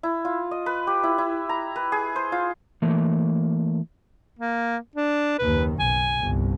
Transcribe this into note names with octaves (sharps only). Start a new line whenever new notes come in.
E4
F4
D#5
B4
G4
E4
E4
A#5
B4
G#4
C5
F4
E3 A3 A#3
A#3
D4
F#1 D#2 D#3 B4
B1 G#5
G1 C2